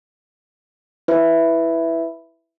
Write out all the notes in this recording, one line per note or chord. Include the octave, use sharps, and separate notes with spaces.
E4 B4 E5